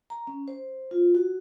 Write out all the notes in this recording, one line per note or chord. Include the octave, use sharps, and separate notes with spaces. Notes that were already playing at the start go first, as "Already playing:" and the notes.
A#5
C#4
C5
F4
F#4